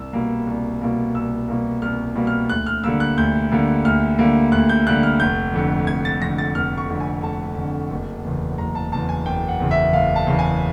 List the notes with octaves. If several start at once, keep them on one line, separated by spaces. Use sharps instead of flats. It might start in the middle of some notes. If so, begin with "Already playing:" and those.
Already playing: C2 E6
B2 G3 A#3
C2
B2 G3 A#3
C2 E6
B2 G3 A#3
C2 F6
B2 G3 A#3
F6
D2 F#6
F6
D3 G3 A#3 E6
F#6
D2 G6
D3 G3 A#3
D2 F6
D3 G3 A#3
D2 F#6
G6
D3 G3 A#3 F#6
F6
F1 G6
F2 D3
F1 G#6
A6
F2 D3 A#6
A6
F1 F6
C#6
F2 D3
G#5
F1 A5
F2 D3
F#1
E2 C#3
F#1 A#5
A5
E2 C#3 A5
G#5
F#1 G5
F#5
E2 C#3
E5
F#1 F5
A5
E2 C#3
G#5